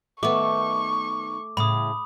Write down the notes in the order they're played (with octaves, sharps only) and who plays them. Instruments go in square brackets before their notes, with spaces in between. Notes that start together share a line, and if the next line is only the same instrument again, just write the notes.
[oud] D#3 B3 [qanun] A3 [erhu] C#6 [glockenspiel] D6
[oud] A2 C#3 [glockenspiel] B5 D#6